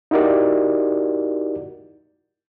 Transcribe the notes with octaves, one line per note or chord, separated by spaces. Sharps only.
D#4 E4 F#4 G4 A#4 D5